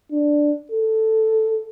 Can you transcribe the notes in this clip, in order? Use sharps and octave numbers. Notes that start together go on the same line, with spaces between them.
D4
A4